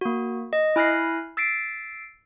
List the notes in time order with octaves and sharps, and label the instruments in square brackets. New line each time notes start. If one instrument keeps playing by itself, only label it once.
[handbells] A#3 F#4
D#5
E4 G#5 F6 F#6 A#6 C7
E6 A6 B6 C7 D7